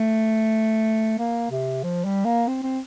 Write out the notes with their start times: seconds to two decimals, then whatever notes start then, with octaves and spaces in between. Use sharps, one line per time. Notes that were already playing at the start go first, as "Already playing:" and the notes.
Already playing: A3
1.19 A#3
1.51 C3
1.83 F3
2.05 G3
2.25 A#3
2.48 C4
2.63 C4